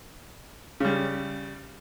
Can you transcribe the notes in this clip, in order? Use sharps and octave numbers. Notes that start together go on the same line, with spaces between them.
C#3 G3